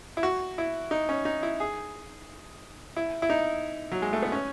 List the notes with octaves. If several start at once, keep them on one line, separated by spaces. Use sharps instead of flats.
E4
F#4
E4
D#4
C#4
D#4
E4
G#4
E4
E4
D#4
F#3
G#3
A3
B3
C#4